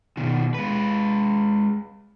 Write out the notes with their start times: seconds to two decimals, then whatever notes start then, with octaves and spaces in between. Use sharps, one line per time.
0.17 B2 D#3
0.54 G#3 B4